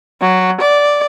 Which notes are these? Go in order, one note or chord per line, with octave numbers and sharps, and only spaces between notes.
F#3
D5